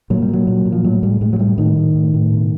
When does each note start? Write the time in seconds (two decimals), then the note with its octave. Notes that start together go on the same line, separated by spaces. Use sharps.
0.10 A#2 F#3
0.22 G3
0.29 A#2 F#3
0.47 A#2
0.66 A#2
0.72 F3
0.84 A2 F#3
1.03 A2 G3
1.21 A2 G#3
1.33 F#3
1.39 A2 G3
1.58 A2 D#3
1.77 A2
1.95 A2
2.14 A2
2.32 B2